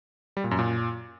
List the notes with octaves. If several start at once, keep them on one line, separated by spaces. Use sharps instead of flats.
G3
A#2
F#2
A#2